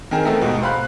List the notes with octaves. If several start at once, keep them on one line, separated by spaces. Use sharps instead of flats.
D#3 C4 G#4 A#4
A3 B3 C4 A4 A#4 E5
D#2 G#2 B2
C5 F5 B5 F#6